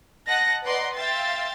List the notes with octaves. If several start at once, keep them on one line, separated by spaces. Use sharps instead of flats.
D#5 F#5 A5 F#6 A#6
B4 D5 D#5 F#5 A#5 C6
E5 F5 G5 C6 A6